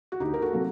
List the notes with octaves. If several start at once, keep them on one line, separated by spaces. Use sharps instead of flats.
F#4
D2 D#4 G4
A#4
F#4 A4
C3 F#3 A#3